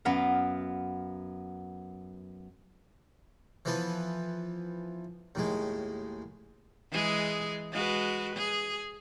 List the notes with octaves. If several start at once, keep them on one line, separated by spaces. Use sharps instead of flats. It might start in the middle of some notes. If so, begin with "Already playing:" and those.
F#2 B3 F5
E3 F3 B3 A4 B4
D#2 A2 G#3
E3 G#3 G#4
G#3 F#4 B4
G#4